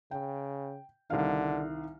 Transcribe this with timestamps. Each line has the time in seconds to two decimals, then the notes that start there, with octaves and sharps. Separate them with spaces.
0.11 C#3 G5
1.10 C2 D3 D#3 F5